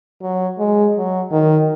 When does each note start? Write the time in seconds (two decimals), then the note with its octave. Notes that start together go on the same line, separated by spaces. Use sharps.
0.22 F#3
0.59 G#3
0.95 F#3
1.32 D#3